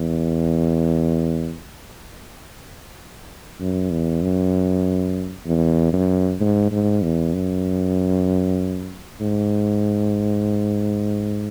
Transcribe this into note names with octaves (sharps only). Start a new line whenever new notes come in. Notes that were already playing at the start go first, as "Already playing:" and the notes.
Already playing: E2
F#2
E2
F#2
E2
F#2
G#2
G#2
E2
F#2
G#2